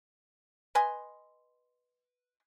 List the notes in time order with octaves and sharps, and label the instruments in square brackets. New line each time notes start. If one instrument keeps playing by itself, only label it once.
[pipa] B4 D#5 G#5 C6